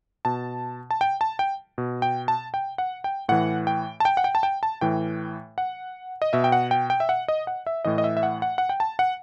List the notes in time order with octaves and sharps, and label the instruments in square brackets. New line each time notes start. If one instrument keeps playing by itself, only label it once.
[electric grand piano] B2 A5
A5
G5
A5
G5
B2
G5
A5
G5
F#5
G5
A2 E3 F#5
G5
A5
G5
F#5
G5
A5
G5
A5
A2 E3 G5
F#5
D#5
B2 E5
G5
F#5
G5
G5
E5
F#5
D#5
F#5
E5
A2 E3 D#5
D#5
E5
E5
F#5
F#5
F#5
G5
A5
F#5